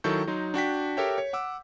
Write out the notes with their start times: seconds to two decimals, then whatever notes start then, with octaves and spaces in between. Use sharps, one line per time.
0.04 D#3 F#3 E4 A4 C#6 G6
0.27 F#3 D#4 C6
0.54 D4 F#4 G5 B6
0.97 G4 A4 A#4 C#5 E5 G5
1.18 C#5
1.33 F#5 D6 E6